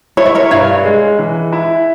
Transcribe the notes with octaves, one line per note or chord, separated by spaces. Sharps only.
E4 C#5
E5
A#4 C#5
G2 C#5 F5
G#3
E3
E4